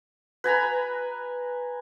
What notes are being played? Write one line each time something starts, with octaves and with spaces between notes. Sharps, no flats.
B4 G#5 A#5 B5